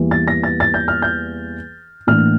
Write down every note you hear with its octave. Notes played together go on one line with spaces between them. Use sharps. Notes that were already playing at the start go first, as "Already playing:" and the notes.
Already playing: E2 E3 G3 A#3
A6
A#6
A6
A6
G6
F6
G6
A2 E3 A#3 D4 F6